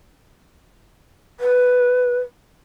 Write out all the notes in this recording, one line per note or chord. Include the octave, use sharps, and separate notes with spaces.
B4